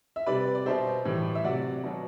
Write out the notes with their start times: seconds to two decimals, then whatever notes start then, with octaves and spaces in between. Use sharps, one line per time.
0.16 E5
0.26 C3 G3 B4 D5
0.55 D5
0.66 B2 G3 C5 E5
1.05 A2 E3 G3
1.35 E5
1.44 C3 F#3 D5 F#5
1.84 B2 F#3